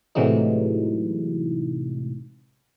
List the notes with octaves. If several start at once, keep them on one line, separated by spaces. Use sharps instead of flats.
A2 C3 E3 F#3 G#3 D#4